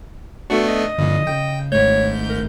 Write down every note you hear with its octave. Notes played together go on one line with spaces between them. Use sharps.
A3 B3 D4 F#4
D#5
G2 A#2 D3 F3
C#3 G5
G#1 G#2 A3 C#5 G6
A#4